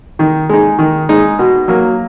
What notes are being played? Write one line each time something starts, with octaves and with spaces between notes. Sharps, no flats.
D#3
G#3 D#4
D#3
G#3 D#4
B2
F#3 A#3